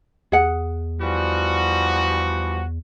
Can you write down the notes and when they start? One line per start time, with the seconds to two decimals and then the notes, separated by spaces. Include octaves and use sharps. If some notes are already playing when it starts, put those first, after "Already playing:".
0.32 E2 G#4 F#5
1.00 E3 F3 G3 F#4